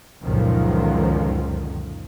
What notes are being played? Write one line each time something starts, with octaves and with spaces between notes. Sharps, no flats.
C#2 F#2 A#2 D3 D#3 F3